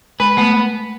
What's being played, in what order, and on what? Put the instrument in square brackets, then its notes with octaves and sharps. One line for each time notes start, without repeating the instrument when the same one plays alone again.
[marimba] G#3 [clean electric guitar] B4
[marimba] A3 [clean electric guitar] B3